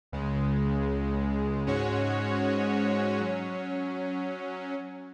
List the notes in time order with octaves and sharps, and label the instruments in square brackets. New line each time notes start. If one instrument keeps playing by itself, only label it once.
[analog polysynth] C#2 C#3 G#3
G#2 G#3 C#4 F#4 C#5
F#3 C#4